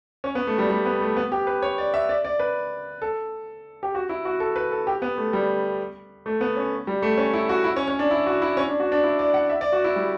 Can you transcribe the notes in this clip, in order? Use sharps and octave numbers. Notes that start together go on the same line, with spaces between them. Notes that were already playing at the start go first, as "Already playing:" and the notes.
C#4
B3
A3
G3
G3
B3
A3
B3
G4
B4
C#5
D5
E5
D5
D5
B4
A4
G4
F#4
E4
F#4
A4
B4
A4
G4
B3
A3
G3
A3
B3
C#4
G3
A3
C#4
E4
F#4
E4
C#4
C#4
D4
E4
F#4
E4
C#4
D4
F#4
D4
E4
D5
F#5
E5
D5
F#4
E4
G3